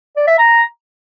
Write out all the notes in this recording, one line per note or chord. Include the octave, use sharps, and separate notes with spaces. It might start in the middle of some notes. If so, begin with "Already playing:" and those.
D5
E5
A#5